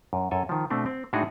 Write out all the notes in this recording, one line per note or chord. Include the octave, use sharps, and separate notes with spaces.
F#2
F#2 A4 G#5
D#3 F3
B2 A3 C4 D4
C4
A2 G#3 D4 D#4 F#4 G#4